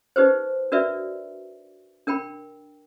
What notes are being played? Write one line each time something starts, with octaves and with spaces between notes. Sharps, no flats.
D#4 G4 B4 C5
D4 F#4 A#4 B4 D5 E5
D4 A#4 G5 B5